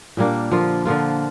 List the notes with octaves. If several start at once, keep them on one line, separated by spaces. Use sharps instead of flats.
A#2 G3 A#3 D4
D3 F3 A#3 F4
D3 F3 A#3 F4